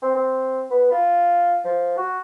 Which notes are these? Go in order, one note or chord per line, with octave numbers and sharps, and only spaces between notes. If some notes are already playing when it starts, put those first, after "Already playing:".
C4
C4
B3
F4
F3
F#4